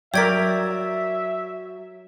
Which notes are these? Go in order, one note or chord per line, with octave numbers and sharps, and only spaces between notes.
F#3 A#4 C#5 D5 E5 G5 G#6 B6